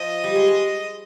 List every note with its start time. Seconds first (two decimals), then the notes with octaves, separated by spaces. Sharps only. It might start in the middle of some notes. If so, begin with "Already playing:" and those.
Already playing: F3 D#5
0.24 G3
0.35 G#3
0.48 G#3